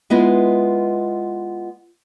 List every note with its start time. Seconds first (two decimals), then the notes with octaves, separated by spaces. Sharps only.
0.10 G#3 B3 E4 F4 B4 D#5